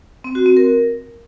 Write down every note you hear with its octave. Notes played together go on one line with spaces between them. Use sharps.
C4
F#4
C4
A#4